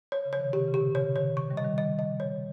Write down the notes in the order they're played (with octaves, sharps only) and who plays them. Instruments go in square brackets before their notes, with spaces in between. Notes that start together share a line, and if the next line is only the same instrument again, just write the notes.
[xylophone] C#5
[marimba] C#3
[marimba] F3 [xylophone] C#5
[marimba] C3 D#3
[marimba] C3 D#3 [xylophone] G4
[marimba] C#3
[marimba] A#2 [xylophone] G4
[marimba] C3
[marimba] C#3 [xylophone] C#5
[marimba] C3 D#3 [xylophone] C#5
[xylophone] C#6
[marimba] D#3 G3
[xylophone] D#5
[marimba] D#3 G3
[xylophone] D#5
D#5
C#5